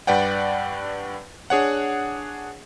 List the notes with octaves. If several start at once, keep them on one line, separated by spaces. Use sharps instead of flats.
G2 B4 D5 F#5 G5
D4 G#4 C#5 F#5